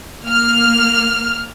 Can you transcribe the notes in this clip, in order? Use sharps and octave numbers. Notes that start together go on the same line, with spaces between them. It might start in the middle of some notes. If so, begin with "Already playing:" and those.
A#3 F6